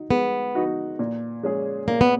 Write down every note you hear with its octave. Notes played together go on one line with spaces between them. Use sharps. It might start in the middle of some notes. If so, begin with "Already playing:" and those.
Already playing: D#4 F#4
G#3 B3
D#4 F#4
A#2
G#3 C#4 G#4
A#2 A#3
B3